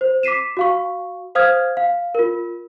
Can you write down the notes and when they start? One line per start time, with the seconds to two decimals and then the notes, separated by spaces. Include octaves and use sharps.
0.01 C5
0.23 D6 B6 C7 D#7 E7
0.57 F#4 F5 C#6
1.35 C5 F5 D#6 F6 G#6
1.77 F5
2.15 F4 A#4